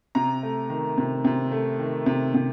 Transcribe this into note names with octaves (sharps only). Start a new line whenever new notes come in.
C3 A#5
A3
D#3
C3
C3
A3
D#3
C3
C3